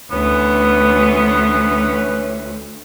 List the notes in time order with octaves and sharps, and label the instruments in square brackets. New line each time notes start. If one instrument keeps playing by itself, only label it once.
[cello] D2 [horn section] E3 C#4 B4 [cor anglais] B3